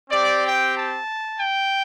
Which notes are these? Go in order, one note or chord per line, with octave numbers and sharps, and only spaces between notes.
C4 G4 D5
G5
A5
G5